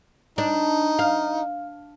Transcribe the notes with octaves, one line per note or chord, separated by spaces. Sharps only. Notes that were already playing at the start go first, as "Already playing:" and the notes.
D4 D#4
F5